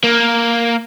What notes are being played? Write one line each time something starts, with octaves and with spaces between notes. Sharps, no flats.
A#3